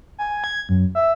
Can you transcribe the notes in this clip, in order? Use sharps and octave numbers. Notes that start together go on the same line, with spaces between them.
G#5
G#6
F#2
E5